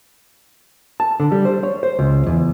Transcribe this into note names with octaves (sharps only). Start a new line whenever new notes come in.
A5
D3
G3
C5
C#5
C5
C#2
E2